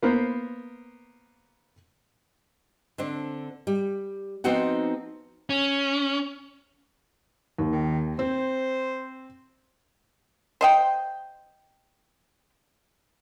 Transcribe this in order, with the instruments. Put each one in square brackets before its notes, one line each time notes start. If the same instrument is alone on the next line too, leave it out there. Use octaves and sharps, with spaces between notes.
[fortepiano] A#3 B3 A#4 C5
[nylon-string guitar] D3 C4 D4
G3
F3 B3 C4 D#4 F#4 F#5
[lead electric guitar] C#4
[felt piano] D#2
[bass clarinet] D#3
[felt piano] C4 [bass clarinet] C5
[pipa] C5 D#5 G5